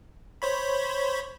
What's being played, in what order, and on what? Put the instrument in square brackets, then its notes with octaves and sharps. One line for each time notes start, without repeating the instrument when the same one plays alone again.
[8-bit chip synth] C5 C#5 B5